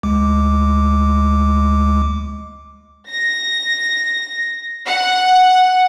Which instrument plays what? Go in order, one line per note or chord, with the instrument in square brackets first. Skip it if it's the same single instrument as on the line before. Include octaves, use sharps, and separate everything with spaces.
[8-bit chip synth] D2 G#3 D6
[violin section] A#6
F#5